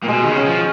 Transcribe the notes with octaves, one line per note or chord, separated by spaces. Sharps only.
A#2
B2 G#3
D#3
C#3
C#4 F#4
F3